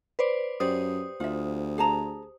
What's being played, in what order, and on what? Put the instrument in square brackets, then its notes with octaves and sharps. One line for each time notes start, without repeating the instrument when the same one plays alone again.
[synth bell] B4 C5 D5
[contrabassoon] F#2 [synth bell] G4 C5 D#6 [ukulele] D5
[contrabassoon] D2 [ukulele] F4 E5
[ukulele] G#4 A5 A#5